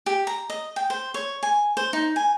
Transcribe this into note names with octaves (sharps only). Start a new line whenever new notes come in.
G4
A#5
D#5
G5
C5
C#5
G#5
C5
D#4
G#5